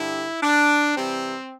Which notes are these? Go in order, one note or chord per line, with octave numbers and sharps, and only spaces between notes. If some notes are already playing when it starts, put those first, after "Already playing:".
Already playing: G2 D3 G3 E4
D4
C3 E3 G3 C4